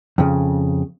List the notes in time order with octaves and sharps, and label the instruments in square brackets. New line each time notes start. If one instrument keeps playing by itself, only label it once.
[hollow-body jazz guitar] F2 C#3